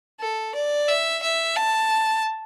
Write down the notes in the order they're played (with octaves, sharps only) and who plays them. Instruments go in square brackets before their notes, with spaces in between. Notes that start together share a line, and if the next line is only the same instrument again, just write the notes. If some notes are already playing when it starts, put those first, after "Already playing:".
[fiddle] A4
D5
E5
E5
A5